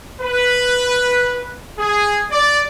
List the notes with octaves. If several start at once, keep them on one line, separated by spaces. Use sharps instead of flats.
B4
G#4
D5